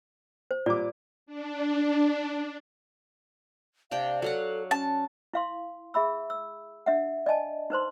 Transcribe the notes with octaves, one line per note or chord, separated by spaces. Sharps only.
C5
A#2 G3 D5 D6
D4
C3 D4 F5 G5
F#3 A4 F5 F#5
C#4 A5
E4 F5 C6
G#4 E5 B5 E6
E6
D4 E5 F#5
D5 D#5 G#5 A5
D#4 B4 C5 C6